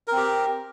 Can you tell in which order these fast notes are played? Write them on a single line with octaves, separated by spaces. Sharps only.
A#4 C4 G4